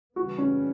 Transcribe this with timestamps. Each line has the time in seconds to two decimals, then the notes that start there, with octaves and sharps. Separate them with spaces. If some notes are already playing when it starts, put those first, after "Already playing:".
0.16 C#3 E3 G3 B3 F#4
0.38 C#4